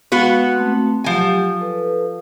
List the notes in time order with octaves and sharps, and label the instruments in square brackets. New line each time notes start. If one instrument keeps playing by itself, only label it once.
[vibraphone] G#3 F5 [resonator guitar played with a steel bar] B3 F#4 B4
[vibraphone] A3 C4
[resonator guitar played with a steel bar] F3 G#5 [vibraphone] F#3 G4
[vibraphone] A4 B4